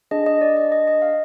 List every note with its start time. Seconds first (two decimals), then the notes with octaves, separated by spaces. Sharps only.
0.11 D4 G#4 D#5
0.26 D#5
0.41 D5
0.57 D#5
0.72 D#5
0.87 D#5
1.02 F5